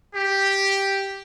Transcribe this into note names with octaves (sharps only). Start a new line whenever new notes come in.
G4